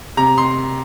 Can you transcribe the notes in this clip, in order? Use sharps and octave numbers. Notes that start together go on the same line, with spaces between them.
C3 A#5
C6